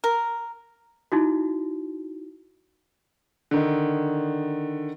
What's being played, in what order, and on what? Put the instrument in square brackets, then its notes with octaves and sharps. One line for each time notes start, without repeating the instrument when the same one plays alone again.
[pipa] A#4
[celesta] D#4 E4 F#4
[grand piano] D3 D#3